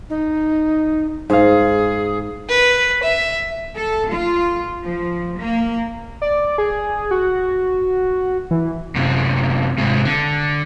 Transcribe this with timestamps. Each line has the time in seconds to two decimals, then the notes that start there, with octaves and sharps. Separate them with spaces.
0.10 D#4
1.30 G#2 G#4 F5
2.49 B4
3.03 E5
3.76 A4
4.11 F4
4.84 F3
5.40 A#3
6.22 D5
6.58 G#4
7.11 F#4
8.51 E3
8.95 F#2 C3
9.78 G#2 C3
10.05 D3